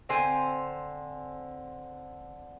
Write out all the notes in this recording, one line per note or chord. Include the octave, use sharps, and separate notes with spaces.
D3 C4 C5 G#5